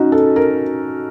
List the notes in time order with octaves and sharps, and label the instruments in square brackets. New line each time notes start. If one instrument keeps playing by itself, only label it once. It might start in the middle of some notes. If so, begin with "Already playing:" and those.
Already playing: [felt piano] C#4 D#4 F#4
A4
A#4